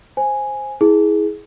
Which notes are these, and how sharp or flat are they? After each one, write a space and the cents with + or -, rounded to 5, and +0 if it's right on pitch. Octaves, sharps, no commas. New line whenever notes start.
C5 +5 G#5 +0
E4 -20 G#4 +10